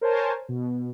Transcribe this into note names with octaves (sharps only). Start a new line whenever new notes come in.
A#4 C5 C#5 G#5 A5
B2